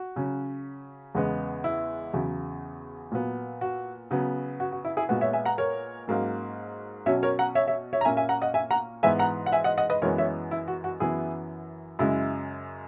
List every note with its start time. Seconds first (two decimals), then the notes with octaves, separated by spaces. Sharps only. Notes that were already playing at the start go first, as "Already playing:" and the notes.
Already playing: F#4
0.16 C#3 F#3 C#4
1.15 E2 C#3 G#3 B3
1.64 E4
2.14 E2 C#3 F#3
3.12 A#2 F#3 B3
3.61 F#4
4.11 C#3 F#3 B3
4.60 F#4
4.72 F#4
4.85 E4
4.97 E4 G#4
5.09 A#2 G#3 B3 F#4
5.21 C#5 E5
5.33 E5 G#5
5.45 F#5 A#5
5.58 A#4 C#5
6.08 G#2 F#3 A#3 C#4
7.06 B2 F#3 C#4 C#5 E5
7.23 A#4 C#5
7.39 F#5 A#5
7.55 C#5 E5
7.68 C#5 E5
7.93 C#5 E5
8.01 A#5
8.05 A#2 A#3 C#4 E5 G#5
8.17 E5 G#5
8.29 F#5 A#5
8.42 D#5 F#5
8.54 E5 G#5
8.71 F#5 A#5
9.03 G#2 E3 B3 E5 G#5
9.19 F#5 A#5
9.46 F#5
9.52 E5 G#5
9.64 D#5 F#5
9.78 D#5 F#5
9.90 B4 D#5
10.02 F#2 E3 G#3 B3 A#4 C#5
10.18 C#5 E5
10.51 E4
10.68 F#4
10.84 F#4
11.00 F#2 E3 B3 E4 G#4
11.99 F#2 C#3 G#3 E4